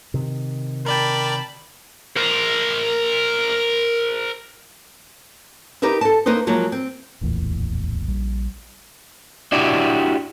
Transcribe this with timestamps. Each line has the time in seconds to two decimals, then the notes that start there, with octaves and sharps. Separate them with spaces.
0.14 C3 D#3
0.86 A#4 D5 G5 A5 B5
2.16 A#4 C5
5.82 D#4 G4 A#4 B4 E5
6.01 A4 A5
6.26 A#3 D#4 B4 C5 D#5
6.47 F3 F#3 G#3 A#3
6.72 C4
7.21 D1 A#1 E2 A2
8.08 A#1 G3
9.52 D4 E4 F#4 G4 D5